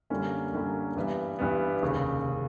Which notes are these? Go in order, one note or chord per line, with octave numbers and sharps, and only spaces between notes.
F#2 D3 G3 A#3 C#4
F#2 D3 G3 A#3 C#4
G2 E3 G3 B3
G2 E3 G3 B3
F1 D#2 C#3
C#3